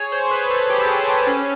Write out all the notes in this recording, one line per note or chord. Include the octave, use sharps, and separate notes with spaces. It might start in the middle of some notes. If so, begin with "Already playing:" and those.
Already playing: G#4 C#5
C5
B4
A4
G4
A4
G#4
G4
C#4